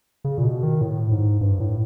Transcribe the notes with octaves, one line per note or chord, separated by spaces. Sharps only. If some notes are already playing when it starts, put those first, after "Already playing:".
C#3
A#2
B2
D#3
A2
G#2
G2
A2